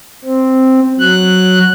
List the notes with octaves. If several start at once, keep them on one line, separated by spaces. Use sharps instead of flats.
C4
F#3 F#6